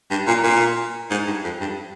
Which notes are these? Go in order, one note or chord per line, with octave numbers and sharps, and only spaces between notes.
G2
A#2
A#2
G#2
G2
F2
G2